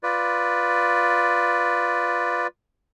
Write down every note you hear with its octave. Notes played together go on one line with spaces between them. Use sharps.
F4 B4 D5